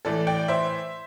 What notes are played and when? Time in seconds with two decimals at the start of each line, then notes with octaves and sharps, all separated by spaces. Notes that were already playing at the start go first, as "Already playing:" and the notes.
0.05 A2 E3 A4 D5
0.27 D5 G5
0.48 C5 E5